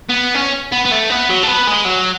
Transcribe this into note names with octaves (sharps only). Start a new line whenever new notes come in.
B3
C#4
B3
B3
A3
B3
F#3
A3
B3
G#3
F#3